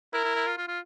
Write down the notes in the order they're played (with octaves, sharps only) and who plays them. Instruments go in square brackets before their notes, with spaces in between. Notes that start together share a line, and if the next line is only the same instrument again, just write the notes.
[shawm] E4 [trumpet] A#4
[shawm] E4
E4
F4
F4
F4